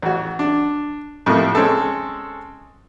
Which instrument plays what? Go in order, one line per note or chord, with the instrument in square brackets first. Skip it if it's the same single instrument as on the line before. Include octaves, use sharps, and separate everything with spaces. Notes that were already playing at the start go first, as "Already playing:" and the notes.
[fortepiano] A1 F#4
D4
F2 A2 C3 F3 A#3
G#3 C4 C#4 A4